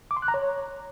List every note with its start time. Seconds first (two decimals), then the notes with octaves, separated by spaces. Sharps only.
0.11 D6
0.17 C6
0.22 F#6
0.28 A#5
0.34 C#5